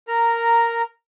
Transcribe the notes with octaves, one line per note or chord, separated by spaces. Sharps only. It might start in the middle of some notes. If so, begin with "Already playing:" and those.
A#4 A#5